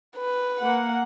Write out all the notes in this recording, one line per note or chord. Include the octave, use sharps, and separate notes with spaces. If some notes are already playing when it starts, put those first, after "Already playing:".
B4
A#3 F#5